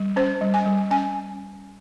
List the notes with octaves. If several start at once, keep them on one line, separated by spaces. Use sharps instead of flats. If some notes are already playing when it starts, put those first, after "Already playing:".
Already playing: G3
C#4 C5
G3
G#5
G3
C#4 G#5